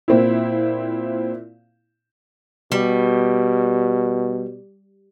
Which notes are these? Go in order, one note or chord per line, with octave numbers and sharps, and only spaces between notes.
A#2 C4 E4
B2 G3